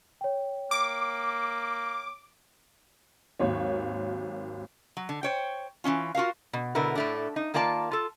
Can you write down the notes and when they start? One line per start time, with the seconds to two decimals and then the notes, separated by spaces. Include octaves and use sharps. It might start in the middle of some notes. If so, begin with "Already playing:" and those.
0.21 C#5 G5
0.71 A#3 D6
3.39 G#1 D#2 F#3 C#5
4.97 F#3
5.09 D3
5.23 C5 C#5 G5
5.84 E3 C4 C#4 F4
6.15 F4 F#4 A#4 F5
6.53 B2
6.75 B2 D3 E4 A#4 B4
6.95 A2 A3 D4
7.36 D#4
7.54 D#3 A#3 F4 D5 A5
7.91 F4 A4